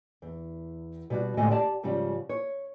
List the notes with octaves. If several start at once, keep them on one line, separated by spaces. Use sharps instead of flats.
E2
B2 G3 F#4
D2 A2 C3 G#3 D#5 G#5
G4 D5 A5
G#2 C#3 F3 G3
C#5